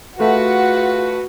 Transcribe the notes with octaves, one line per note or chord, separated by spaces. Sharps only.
A3 F4 F#4 G#4 B4 F#5